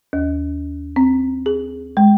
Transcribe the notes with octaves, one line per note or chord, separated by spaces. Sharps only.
D#2
C4
G#4
G#3